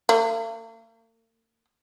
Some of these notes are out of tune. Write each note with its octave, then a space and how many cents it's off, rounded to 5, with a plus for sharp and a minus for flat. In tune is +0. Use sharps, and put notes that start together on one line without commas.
A#3 -45